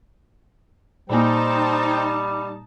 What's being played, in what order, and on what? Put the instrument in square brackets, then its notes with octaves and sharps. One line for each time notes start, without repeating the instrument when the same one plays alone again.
[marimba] A#2 A#3 [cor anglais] G3 [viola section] D#4 A5 [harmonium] C5 G5